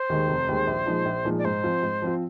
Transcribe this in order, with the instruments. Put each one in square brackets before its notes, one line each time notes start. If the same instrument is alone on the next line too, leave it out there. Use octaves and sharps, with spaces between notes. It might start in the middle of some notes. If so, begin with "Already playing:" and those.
Already playing: [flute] C5
[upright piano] D#2 D#3 G#3
F1
D#2 D#3 G#3
A#1
A#2 F3 G#3 D#4
A#1
A#2 F3 G#3 D#4
[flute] D5
[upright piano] G#2 [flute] C5
[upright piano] F3 C4 F4
G#2
F3 C4 F4